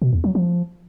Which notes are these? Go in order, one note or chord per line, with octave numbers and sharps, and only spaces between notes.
B2
E2
F#3
F3